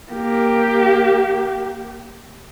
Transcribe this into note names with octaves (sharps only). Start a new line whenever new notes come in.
A#3 G4